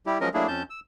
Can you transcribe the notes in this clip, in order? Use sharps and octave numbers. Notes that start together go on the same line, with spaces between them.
G3 E4 G4
F3 F#3 G#3 C#4 A#4 D#5
F#3 A3 A#3 D4 E4 G#4
F2 C#4 A5 G6
E6